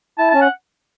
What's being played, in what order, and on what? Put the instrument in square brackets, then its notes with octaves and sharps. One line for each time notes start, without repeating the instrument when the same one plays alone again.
[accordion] E4 [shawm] A5
[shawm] A5
[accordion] C#4
[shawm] F#5